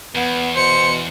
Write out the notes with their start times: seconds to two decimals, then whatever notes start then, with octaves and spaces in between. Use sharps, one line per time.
0.15 E2 B3
0.56 B2 C5 C#7